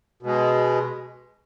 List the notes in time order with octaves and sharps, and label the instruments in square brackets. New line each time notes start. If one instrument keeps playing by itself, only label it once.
[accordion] B2 G#3